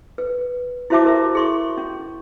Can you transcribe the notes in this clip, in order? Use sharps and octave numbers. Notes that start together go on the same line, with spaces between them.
B4
E4 F#4 C5 E5 A5 D6
G4 A#4 C5 E5
G#4 C6 C#6
C#4